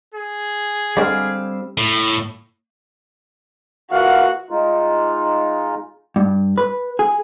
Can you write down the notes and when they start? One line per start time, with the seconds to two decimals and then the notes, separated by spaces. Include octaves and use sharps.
0.14 G#4
0.97 D3 G3 G#3 C4 F5
1.78 A2
3.91 A#2 E3 F#4 F5 F#5
4.50 G#3 D#4 F4
6.16 G2
6.58 B4
6.99 G#4